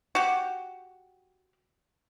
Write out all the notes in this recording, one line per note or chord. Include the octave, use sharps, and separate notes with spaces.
F#4 G4